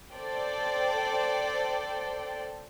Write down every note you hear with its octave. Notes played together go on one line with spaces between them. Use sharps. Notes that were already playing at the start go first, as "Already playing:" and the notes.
A4 C5 D5 G5